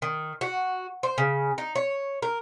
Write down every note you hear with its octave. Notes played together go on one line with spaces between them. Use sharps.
D#3
F#4
C5
C#3
D#4
C#5
A#4